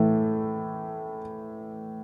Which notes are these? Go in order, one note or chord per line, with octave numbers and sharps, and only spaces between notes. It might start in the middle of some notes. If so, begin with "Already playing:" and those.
Already playing: A2 E3 A3